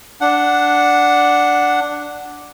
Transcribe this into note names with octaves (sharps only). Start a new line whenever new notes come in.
D4 F#5